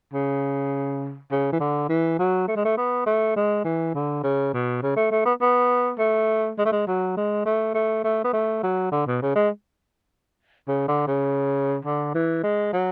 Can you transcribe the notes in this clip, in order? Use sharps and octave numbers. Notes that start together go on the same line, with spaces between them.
C#3
C#3
E3
D3
E3
F#3
A3
G#3
A3
B3
A3
G#3
E3
D3
C#3
B2
C#3
A3
A3
B3
B3
A3
G#3
A3
G#3
F#3
G#3
A3
A3
A3
B3
A3
F#3
D3
B2
C#3
G#3
C#3
D3
C#3
D3
E3
G#3
F#3